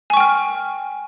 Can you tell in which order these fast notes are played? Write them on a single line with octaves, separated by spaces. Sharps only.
G#5 C#6 G5 F6